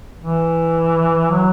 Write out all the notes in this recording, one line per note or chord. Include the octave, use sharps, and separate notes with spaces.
E3
F#3